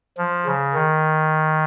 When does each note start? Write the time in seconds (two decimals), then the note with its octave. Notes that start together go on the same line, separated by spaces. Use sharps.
0.18 F3
0.46 C#3
0.74 D#3